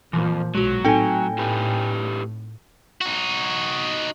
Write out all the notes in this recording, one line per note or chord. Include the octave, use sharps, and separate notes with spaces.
F2 A#2 E3 F3
B1 F#3 G#3 F#4
A2 C4 D#4 A4 G5 G#5
E4 G4 B4
D#4 F#4